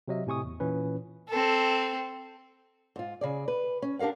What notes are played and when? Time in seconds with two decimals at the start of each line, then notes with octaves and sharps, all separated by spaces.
0.08 C3 F#3 D#5 E5
0.26 A2 C3 G#5 C#6 D#6
0.44 E2
0.60 A#2 E3 C#4 B4
1.29 C4 A4
2.96 G#2 F4
3.21 C#3 G#4 D5
3.48 B4
3.82 C#4
3.99 D4 G4 A#4 F5 F#5